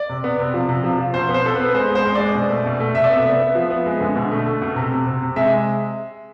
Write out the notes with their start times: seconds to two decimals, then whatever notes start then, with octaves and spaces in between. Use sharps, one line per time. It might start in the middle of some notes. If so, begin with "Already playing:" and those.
Already playing: D5
0.09 C3
0.24 B3
0.39 C3
0.54 F3
0.69 C3
0.84 F3
0.99 F3
1.14 B2 C5
1.29 B3
1.34 C5
1.44 B3 A4
1.55 B3 B4
1.74 G#3 C5
1.90 G#3
1.95 C5
2.05 G#3
2.15 G#3 D5
2.34 B2
2.50 A3
2.66 B2
2.80 A3
2.95 C3 E5
3.04 D5
3.10 B3 E5
3.25 B3
3.41 B3
3.55 F3
3.70 B3
3.86 G#3
4.01 D3
4.16 B2
4.31 A3
4.46 A3
4.62 B2
4.76 C3
4.91 C3
5.06 C3
5.22 C3
5.36 G#3 E5